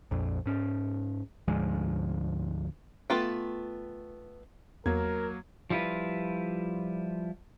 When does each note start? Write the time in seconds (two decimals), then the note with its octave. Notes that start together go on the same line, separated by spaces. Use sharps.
0.11 A#1 F2
0.46 G#2 C#4
1.48 D2 G#2 F3 G#3
3.10 A3 B3 F4 G5
4.86 E2 F#3 A#3 A#4 G#6
5.70 F3 G3 E4 F4 B4